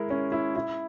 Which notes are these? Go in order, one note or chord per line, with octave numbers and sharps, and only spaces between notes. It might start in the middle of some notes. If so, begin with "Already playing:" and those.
Already playing: G#3 E4 A#4
C#4
E4
E4